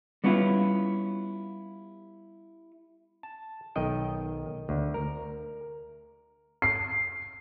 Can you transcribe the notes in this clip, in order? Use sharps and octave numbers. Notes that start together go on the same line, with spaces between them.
G3 B3 C#4 E4 F4
A5
B1 D#3 D#5 G5
D2
A#4
C7